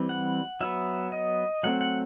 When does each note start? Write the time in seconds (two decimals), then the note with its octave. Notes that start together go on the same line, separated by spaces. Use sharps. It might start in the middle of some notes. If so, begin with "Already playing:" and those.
Already playing: E3 G3 C4
0.09 F#5
0.61 F#3 B3 E5
1.12 D#5
1.63 F#3 A3 C4 F#5
1.81 F#5